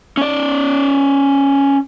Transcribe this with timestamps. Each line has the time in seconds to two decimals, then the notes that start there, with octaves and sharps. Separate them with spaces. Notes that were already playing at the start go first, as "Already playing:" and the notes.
0.17 C#4 D5